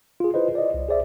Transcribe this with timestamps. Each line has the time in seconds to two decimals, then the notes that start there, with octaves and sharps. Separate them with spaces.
0.20 F4 G#4
0.34 E4 F4 B4 C5 D#5
0.55 D5 D#5
0.74 C2
0.89 G#4 C5 D5 E5